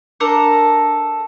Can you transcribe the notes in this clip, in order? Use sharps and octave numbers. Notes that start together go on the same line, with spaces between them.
D4 A4 A#4 A#5